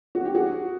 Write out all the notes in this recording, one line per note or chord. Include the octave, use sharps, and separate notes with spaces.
F#4
G4
F#4 G#4